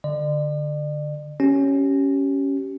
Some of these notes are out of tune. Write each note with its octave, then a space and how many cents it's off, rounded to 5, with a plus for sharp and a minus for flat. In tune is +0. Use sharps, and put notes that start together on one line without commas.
D3 +0 D5 +40
C#4 +0 G4 -25